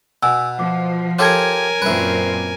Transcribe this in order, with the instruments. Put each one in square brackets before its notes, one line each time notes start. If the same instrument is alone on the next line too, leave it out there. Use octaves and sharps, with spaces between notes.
[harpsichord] B2 [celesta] G#5 E6
[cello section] F3 [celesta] D6
[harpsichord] F4 G4 A4 [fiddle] A#4 G#5 [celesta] C#5 G#6
[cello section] F#2 A#2 C4 [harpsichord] B4 E5